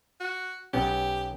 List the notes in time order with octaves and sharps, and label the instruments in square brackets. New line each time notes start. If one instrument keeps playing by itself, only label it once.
[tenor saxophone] F#4
[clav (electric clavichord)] B1 B3 C#4 [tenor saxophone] G4